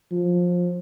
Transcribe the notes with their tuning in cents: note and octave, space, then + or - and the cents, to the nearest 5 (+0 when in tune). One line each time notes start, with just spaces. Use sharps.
F3 +20